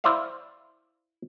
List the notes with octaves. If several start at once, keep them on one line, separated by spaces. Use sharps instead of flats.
E4 C5 D5 E5 F5